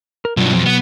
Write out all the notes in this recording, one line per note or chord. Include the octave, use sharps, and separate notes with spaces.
A#4
G2 B2 F3 F#3
F2
B3